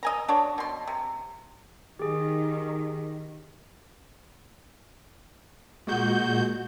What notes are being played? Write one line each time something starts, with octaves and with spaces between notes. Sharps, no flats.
D#5 G#5 A#5
D4 F#4 C#5
B2 C6
C3
D#3 G4 G#4
A#2 G#3 F#4 G6